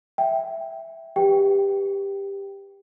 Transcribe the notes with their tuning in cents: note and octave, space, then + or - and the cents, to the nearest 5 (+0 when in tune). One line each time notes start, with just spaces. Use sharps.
E5 +0 G5 +0
G4 +15 B4 +0 G5 +0